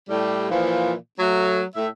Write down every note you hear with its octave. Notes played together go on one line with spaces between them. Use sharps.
A2 G3
A#2 E3 F3
F#3 A3
A2 E5